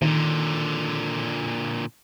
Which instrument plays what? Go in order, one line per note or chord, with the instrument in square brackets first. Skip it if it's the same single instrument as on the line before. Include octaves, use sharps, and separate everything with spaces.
[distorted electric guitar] A#2 D3 [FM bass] D#3